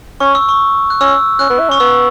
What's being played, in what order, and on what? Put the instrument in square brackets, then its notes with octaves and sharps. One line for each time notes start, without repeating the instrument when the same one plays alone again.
[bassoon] C#4 [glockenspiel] C#6
[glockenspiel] E6
C#6
F#6
[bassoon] C#4 [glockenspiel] E6
[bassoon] C#4 [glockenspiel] F#6
[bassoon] B3
E4
C#4
[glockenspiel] C#6
[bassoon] B3 [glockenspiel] E6